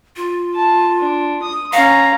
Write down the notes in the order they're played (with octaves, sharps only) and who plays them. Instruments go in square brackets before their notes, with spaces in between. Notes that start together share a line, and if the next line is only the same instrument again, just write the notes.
[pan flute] F4
[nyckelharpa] A5
D4
D#6
[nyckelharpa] C#4 A#5 [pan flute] F5